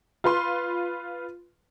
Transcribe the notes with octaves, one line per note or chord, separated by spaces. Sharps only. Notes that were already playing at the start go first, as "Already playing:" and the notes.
F4 B4 C6